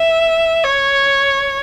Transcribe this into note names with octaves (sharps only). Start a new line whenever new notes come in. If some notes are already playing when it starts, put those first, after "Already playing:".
Already playing: E5
C#5